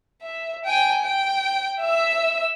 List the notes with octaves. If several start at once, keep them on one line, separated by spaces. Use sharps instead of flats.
E5
G5 G#5
G5
E5 E6